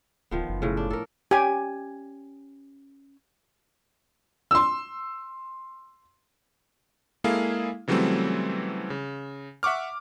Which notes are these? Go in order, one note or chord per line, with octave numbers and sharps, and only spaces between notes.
D1 D#3 F3 B3
F#1
A2 C#3
D4
A4 A#4
C#4 G4 G#5
C6 E6
G#3 A#3 E4 G#4 A4 F5
C#3 E3 F#3 G3 A3 C4
C#3
E5 F#5 C#6 D6 F6